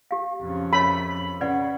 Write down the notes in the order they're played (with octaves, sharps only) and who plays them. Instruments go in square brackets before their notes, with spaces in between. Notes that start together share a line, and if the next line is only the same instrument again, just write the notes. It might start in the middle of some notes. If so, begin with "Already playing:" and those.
[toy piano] G4 F5
[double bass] F2 C#3
[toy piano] A#4 C#5 D#5 [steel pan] B5
[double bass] C#3 [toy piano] B4 D5 F#5